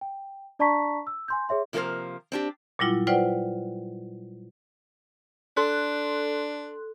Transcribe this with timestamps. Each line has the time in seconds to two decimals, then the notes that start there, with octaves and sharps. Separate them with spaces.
0.01 G5
0.59 D4 D5 A5 A#5 C#6 B6
1.07 E6
1.28 G#5 C6 G6
1.49 G#4 C#5 E5 C6
1.73 C3 F3 A#3 A4 A#4 C5
2.32 C4 D4 G4
2.79 A#2 F#3 G3 E4 F4
3.07 F4 B4 C5 D5 F#5 G5
5.57 D4 A4 C6 F#6